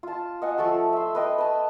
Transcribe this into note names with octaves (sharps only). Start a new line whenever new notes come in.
F4 A5
D#5 F#5 G#5
F3 A3 A5 E6
E5 C6
B4 D#5 G5
B4 A5